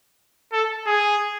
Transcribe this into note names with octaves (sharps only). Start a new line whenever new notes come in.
A4
G#4